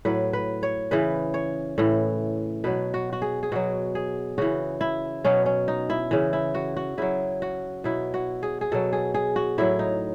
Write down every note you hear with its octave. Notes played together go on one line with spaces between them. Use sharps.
A2 F#3 B4
B4
C#5
C#3 E3 B4
C#5
A2 E3
B2 F#3 B4
F#4
F#4
G#4
G#4
B2 F#3 F#4
G#4
C#3 E3 F#4
E4
B2 F#3 C#4
C#4
D#4
E4
C#3 E3
E4
F#4
F#4
C#3 F#3 E4
F#4
B2 F#3 E4
F#4
G#4
G#4
B2 F#3 A4
G#4
G#4
F#4
A2 F#3 E4
D#4